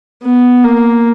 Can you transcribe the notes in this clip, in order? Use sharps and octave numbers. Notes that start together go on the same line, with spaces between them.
B3
A#3